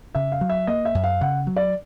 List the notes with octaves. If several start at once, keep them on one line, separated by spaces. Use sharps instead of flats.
C#3 E5
F5
F#3
E5
A#3 D#5
E5
F#2
F5
C#3 F#5
F#3
D5